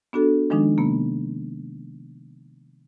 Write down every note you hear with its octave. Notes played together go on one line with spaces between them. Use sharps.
B3 D4 F#4 A4
D#3 F3 G#3 D4 D#4
C3 A#3 B3